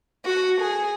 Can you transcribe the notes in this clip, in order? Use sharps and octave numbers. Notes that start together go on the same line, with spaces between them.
F#4
G#4